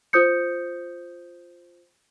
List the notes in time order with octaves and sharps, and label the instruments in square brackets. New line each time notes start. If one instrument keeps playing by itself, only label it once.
[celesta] F4 C5 D#6 G6 C#7